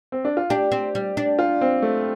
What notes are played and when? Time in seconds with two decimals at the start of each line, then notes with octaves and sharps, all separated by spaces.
0.12 C4
0.25 D4
0.37 F4
0.50 D4 G4
0.72 C4
0.95 G3
1.17 D4
1.39 F4
1.61 C4
1.82 A3